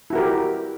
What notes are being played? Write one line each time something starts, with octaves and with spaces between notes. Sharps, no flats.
E4 F#4 G4 A#4